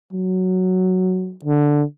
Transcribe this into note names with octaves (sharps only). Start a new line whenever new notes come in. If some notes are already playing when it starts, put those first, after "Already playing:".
F#3
D3